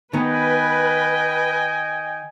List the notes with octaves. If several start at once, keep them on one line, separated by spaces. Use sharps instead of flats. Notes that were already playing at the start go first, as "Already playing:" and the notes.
D#3 B3 B4 D#5 G5 G#5